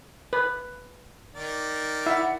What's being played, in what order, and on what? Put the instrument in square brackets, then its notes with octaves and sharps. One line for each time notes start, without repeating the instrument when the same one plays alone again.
[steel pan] B4
[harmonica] D#3 A#4 D5
[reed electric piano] E4 [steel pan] E5 [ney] F#5